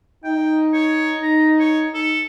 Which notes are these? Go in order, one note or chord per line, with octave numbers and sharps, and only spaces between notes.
D#4 G5
C#5
A#5
C#5
A4